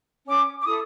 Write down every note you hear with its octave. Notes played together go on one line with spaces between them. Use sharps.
C#4 D6
D6
E4 A4 D#6